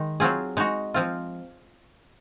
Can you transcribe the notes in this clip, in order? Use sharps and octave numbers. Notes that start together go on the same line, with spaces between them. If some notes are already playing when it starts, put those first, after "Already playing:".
Already playing: D#3 G#3 D#4
F#3 C4 F4 G#4
G#3 D#4 F#4
F3 C4 F4